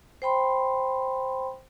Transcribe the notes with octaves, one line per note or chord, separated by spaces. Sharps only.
C5 G5 B5 C6